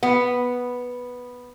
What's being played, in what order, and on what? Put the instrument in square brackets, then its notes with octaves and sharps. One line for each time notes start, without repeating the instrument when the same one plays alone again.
[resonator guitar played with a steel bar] B3